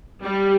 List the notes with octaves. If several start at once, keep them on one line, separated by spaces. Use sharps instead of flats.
G3